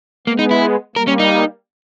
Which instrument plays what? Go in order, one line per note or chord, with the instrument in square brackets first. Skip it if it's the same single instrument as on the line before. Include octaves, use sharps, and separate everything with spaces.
[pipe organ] G#3 B3 [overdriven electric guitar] A#3
[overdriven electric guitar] D#4
E4
[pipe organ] G3 A#3 [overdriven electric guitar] A#4
[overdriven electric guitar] C#4
D#4